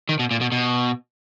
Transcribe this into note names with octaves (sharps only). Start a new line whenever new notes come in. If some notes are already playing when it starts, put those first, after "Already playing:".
D#3
B2
A#2
B2
B2